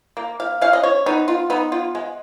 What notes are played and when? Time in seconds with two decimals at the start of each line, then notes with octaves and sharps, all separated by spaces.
0.17 A#3
0.40 F5
0.61 C#4 F5
0.73 D#5
0.83 C#5
1.06 B3 D#4
1.28 F4
1.50 B3 D#4
1.72 F4
1.95 G#3